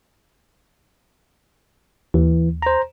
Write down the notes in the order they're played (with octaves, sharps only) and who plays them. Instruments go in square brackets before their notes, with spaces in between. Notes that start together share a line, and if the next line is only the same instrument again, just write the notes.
[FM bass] D#2 [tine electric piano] E3
[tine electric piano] C5 A#5